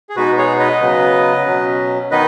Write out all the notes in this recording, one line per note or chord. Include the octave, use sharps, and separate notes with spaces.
G#4
B2 G#3 B3 D#4 F#4 B4
G#4 C#5
B4 D#5
C#3 F#3 B3
B2 F#3 C#4
D#3 B3 D#4 B4 D#5